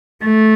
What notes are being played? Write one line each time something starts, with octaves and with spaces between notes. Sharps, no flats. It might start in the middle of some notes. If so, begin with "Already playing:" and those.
A3